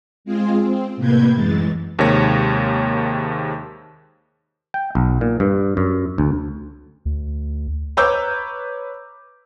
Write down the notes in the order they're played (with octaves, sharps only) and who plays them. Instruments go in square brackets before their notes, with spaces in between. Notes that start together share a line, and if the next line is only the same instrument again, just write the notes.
[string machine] G#3 C4 F4 G#4
C4
A2 C3 A#3 B4 G6 G#6
F#2 E3 G#3 A6
[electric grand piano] D#2 C3 D#3 G#3 C#5 A#6
[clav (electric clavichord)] G5
B1
A#2
G2
F#2
D2
[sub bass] D2
[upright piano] B4 C#5 A#5 D6 E6 G6